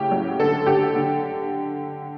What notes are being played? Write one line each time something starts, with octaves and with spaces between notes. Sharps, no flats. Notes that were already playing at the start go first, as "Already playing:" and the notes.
Already playing: A2 C#3 G4
F#3
D3 A4
D3 G4
D3